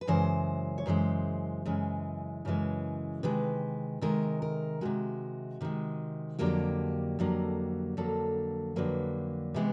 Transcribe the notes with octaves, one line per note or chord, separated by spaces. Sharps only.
B4
F#2 C#3 E3 G#3 C5
C#5
F#2 C#3 E3 G#3 C5
F#2 C#3 E3 G#3
F#2 C#3 E3 G#3
C3 D#3 G#3 B4
C3 D#3 G#3 A#4
A#4
C3 D#3 G#3 F#4
C3 D#3 G#3
F2 D3 F#3 A#3 G4
F2 D3 F#3 A#3
F2 D3 F#3 A#3 A4
F2 D3 F#3 A#3 B4
C3 E3 G#3 B3